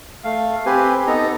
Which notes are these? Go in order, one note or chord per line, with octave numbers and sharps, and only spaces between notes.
A3 F5
C4 G4 B4 G#5
B3 D#4 A4 A#5